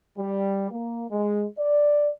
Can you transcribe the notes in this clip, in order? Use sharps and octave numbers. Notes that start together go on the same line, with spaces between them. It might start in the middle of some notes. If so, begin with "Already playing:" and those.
G3
A#3
G#3
D5